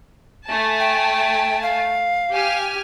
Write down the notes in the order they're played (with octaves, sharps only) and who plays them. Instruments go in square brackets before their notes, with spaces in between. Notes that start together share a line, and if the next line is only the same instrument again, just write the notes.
[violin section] A3 G#5 A5
[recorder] G5
F5
[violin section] G4 G#5 F6